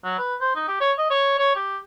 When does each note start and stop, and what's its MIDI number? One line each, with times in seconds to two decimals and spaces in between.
0.04 0.14 54
0.19 0.36 71
0.41 0.55 72
0.56 0.63 63
0.68 0.78 67
0.81 0.92 73
0.98 1.10 75
1.10 1.34 73
1.38 1.54 73
1.56 1.78 67